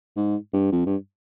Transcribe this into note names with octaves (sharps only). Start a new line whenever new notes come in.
G#2
G2
F2
G2